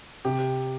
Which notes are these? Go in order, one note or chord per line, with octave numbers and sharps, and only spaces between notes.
C3 G4